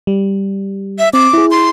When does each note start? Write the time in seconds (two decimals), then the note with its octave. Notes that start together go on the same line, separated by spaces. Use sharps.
0.07 G3
0.99 E5
1.13 C4 D6
1.33 E4 G#4
1.51 C6